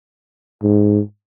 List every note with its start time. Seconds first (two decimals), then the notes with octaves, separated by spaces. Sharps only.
0.63 G#2